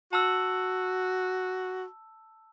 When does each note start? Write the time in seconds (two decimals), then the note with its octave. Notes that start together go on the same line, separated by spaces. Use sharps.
0.13 F#4 A5 E6